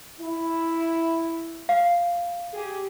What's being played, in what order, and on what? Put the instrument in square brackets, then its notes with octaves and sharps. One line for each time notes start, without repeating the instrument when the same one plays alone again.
[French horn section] E4
[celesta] F5
[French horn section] G4 G#4